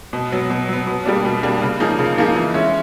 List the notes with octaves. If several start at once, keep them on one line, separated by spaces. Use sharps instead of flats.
B2
F#3 B3
B2
F#3 B3
B2
G3 A#3 D4
B2
G3 A#3 D4
C#3
F3 A#3 D#4 G#4
C#3
F3 A#3 D#4 G#4
E3
G#3 C#4 E4